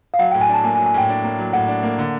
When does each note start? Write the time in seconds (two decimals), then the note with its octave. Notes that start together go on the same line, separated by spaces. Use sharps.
0.14 F5
0.19 F#3 F#5
0.31 A2 G5
0.41 G#5
0.49 D4 A5
0.64 A#3 G#5
0.75 G#5
0.79 F#3
0.86 G#5
0.94 A2 G5
1.09 D4
1.24 A#3
1.39 F#3
1.53 A2 F#5
1.68 D4
1.83 A#3
1.99 D3